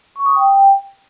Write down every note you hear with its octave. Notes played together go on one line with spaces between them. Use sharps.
C#6
D#6
G5